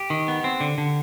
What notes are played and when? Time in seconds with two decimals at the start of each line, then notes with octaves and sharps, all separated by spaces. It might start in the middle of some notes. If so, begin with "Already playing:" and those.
Already playing: G4
0.10 D#3
0.28 B3
0.44 C4
0.61 D3
0.78 D3